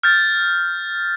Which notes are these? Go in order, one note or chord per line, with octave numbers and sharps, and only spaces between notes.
F6 G6 A6